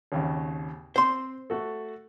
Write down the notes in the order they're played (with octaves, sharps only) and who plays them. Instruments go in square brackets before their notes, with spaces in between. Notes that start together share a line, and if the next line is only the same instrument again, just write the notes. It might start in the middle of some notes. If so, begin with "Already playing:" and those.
[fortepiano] G#1 D#2 C#3
[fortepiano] C4 [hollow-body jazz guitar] C5 C6
[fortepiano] A3 F#4 A4